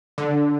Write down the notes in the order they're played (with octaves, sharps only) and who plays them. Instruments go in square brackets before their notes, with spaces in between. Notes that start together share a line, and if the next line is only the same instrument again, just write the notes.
[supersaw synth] D3